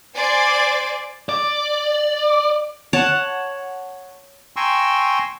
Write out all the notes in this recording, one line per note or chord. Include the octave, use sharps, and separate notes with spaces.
C5 D5 G#5 C6 D6
D5
C#5 F#5 A5
G5 G#5 A#5 C6 C#6 E6